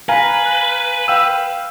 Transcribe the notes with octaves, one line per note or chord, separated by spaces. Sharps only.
B4 F5 G#5 A#5
F5 G5 E6